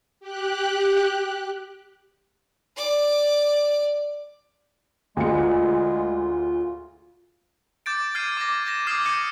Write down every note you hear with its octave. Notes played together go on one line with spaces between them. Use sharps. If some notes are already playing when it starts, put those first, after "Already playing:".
G4 F#6
D5 D6
D2 G#3 F4 G#4 C#7
D6 G6 A6 D7
F6 G#6 C7 D#7
D6 A#6
G6 A#6 E7
D6 D#6 F6 G#6 C7
D6 G6 G#6 A#6 C#7 D#7